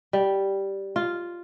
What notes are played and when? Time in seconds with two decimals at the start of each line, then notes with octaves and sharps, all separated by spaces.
0.13 G3
0.96 F4